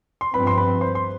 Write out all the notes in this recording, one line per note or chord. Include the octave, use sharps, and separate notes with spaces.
C6
G2 F3 C4 B4 B5
C6
B4 B5
C5 C6
C6